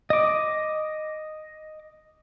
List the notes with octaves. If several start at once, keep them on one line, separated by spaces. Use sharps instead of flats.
D#5 D6